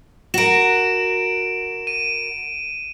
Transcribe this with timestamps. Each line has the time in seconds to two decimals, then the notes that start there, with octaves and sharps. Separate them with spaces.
0.34 F#4 A#4 D7 E7
1.87 D#7